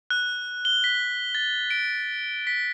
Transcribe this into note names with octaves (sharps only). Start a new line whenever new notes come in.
F#6
G7
B6
A6
D7
B6